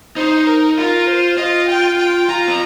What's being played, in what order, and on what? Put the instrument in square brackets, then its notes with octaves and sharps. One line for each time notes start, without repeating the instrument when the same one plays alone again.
[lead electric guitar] D#4 [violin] C5
[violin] A#4
[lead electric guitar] F4 [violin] A#4
[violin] C5
[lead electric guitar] F4 [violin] D#5
[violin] G5
G5
[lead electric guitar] F4 [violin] A#5
[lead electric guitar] C4